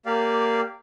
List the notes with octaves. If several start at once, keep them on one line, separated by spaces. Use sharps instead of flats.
A#3 G4 D5 F5